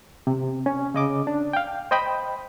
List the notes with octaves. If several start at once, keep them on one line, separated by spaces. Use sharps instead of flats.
C3
C#4
C#3 D#5 D6
D4
F5 G5
C5 D#5 G5 B5